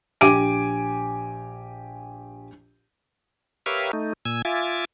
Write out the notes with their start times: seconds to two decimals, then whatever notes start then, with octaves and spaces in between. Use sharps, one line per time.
0.21 A#1 G4 G#5 D6 D7 D#7
3.66 G4 A#4 B4 C#5 E5 F5
3.93 A3 D#4
4.25 A#2 G#5 E6
4.45 F4 E5 G#5 D6 A6